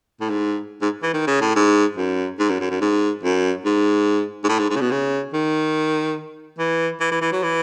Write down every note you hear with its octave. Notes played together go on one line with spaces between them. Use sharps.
A2
G#2
G#2
E3
D#3
C#3
A2
G#2
F#2
G#2
F#2
F#2
F#2
G#2
F#2
G#2
G#2
A2
G#2
G#2
C#3
B2
C#3
D#3
E3
E3
E3
E3
F#3
E3